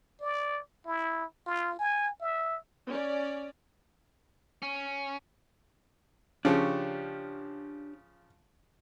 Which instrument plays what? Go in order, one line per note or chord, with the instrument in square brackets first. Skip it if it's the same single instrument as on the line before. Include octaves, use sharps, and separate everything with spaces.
[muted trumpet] D5
E4
F4
G#5
E5
[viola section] C#4 D5
[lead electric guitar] C#4
[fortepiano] C#3 F3 [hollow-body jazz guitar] D4 G4 C#5